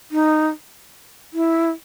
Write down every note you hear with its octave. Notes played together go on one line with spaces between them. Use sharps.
D#4
E4